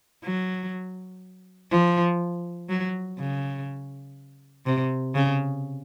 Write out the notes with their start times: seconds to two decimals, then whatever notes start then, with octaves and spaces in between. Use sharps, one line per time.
0.24 F#3
1.71 F3
2.69 F#3
3.18 C#3
4.66 C3
5.15 C#3